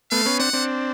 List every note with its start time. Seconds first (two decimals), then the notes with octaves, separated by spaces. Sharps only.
0.11 A3 B3 F5
0.26 B3 C#4
0.39 C4 D4 F#5
0.53 C4 D4